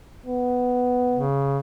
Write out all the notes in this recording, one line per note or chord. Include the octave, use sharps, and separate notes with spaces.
B3
C#3